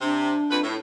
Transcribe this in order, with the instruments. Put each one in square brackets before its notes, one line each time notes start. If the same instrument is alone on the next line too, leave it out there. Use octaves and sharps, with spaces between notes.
[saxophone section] C3 [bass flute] D4
[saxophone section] F2 B4
A2